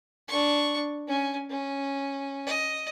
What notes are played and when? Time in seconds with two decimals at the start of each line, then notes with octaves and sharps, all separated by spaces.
0.28 D4 C#6
1.08 C#4 G#5
1.50 C#4
2.46 D#5